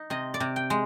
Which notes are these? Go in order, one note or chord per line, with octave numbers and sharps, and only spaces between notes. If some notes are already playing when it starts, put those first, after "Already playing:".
Already playing: D#4
C3 D#5
D5
C3
G5
G#3